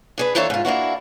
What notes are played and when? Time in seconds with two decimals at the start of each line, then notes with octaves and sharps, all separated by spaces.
0.18 D4 G#4 B4
0.35 E3 A#3 D4 A4 C5 C#5
0.50 G#2 F4
0.65 A#3 D4 E4 F#4